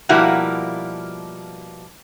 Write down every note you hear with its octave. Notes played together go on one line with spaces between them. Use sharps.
B2 F3 G3 A#3 E4 F#4